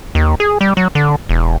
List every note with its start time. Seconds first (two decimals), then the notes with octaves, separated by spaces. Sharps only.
0.15 D#2
0.40 G#4
0.61 G3
0.77 F#3
0.95 D3
1.29 E1